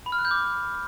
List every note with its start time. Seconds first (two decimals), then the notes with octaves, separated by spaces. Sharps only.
0.06 B5
0.12 F6
0.19 F#6
0.25 G6
0.31 D6